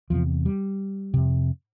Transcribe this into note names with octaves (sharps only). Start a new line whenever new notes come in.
E2 C3 F3
G3
F2 C3